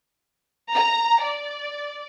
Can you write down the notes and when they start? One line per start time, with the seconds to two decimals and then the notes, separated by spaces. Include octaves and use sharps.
0.75 A#5
1.23 D5